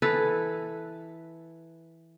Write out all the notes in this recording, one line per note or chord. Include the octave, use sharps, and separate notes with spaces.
E3 A4 B4